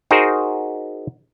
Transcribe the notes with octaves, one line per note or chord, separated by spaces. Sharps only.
D#4 F#4 G#4 A#4 C5